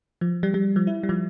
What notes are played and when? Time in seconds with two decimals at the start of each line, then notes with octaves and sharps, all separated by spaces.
0.21 F3
0.43 G3
0.54 G3
0.76 F3
0.87 E4
1.03 G3
1.09 F3